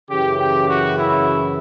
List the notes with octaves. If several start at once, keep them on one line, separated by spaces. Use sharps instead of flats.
F#2 C#3 E3 G4
G4
F#4
E4